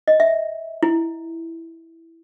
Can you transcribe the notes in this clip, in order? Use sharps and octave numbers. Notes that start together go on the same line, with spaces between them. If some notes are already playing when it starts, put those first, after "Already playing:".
D#5
E5
E4